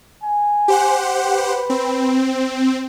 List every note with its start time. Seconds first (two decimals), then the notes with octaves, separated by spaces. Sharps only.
0.23 G#5
0.68 G4 C5 F#5
1.23 B4
1.70 C4